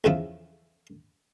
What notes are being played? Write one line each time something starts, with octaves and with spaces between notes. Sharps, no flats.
E2 C#3 F3 E4